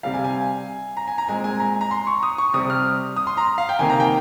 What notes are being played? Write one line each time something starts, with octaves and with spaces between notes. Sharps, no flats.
C3 G3 C4 F5
G#5
G#5
A#5
G#5
A#5
A#2 G#3 C4 G#5
G#5
A#5
A#5
C6
C#6
D#6
C#6
C3 G3 C4 D#6
F6
D#6
C6
A#5
F5
G5
C3 D#3 A#3 G#5
A#5
G5